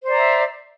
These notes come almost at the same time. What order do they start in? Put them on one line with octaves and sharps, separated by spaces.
C5 D5 A#5 E5